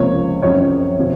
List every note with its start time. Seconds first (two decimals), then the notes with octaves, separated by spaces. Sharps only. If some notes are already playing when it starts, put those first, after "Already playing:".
Already playing: C#2 C3 F3 A#3 C#5
0.42 F#2 F3 C4 C#5
0.99 C3 F3